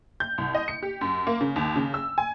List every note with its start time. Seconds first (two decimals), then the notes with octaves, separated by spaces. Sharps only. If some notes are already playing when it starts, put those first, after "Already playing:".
0.20 G6
0.38 C2
0.54 D#5
0.68 C#7
0.83 G4
1.01 F#2
1.27 A#3
1.41 C#3
1.56 D#2
1.76 C#3
1.94 E6
2.18 G#5